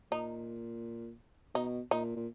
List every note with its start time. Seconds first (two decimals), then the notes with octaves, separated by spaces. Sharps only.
0.11 A#2 D#4
1.55 B2 D#4
1.91 A#2 D#4
2.16 A#2